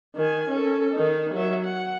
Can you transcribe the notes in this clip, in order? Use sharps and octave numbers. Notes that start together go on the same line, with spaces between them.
D#3 G#5
C#4 A4
D#3 D#4
F#3 E5
F#5